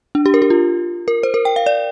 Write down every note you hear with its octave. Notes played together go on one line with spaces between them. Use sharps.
D4
G4
A#4
G4
F4
A#4
C5
A#4
G5
F5
D5